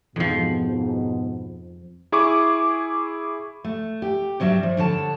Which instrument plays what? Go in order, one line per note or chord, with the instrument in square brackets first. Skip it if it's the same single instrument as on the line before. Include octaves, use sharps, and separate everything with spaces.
[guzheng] F2 F3 [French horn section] G#2 B2
[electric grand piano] E4 G#4 C#6 D6
[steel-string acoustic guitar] A3
G4
G2 F#3 G3 D4 E5
F3
G2 D3 C#5 A5